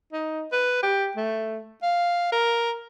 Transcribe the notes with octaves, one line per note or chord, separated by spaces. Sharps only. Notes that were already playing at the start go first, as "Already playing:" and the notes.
D#4
B4
G4
A3
F5
A#4